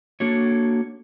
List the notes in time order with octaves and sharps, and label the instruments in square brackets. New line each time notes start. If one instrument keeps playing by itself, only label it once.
[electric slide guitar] A#3 D4 F#4 A4 C#5